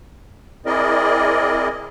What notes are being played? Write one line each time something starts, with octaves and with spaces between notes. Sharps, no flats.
C4 E4 G#4 A#4 D5 D#5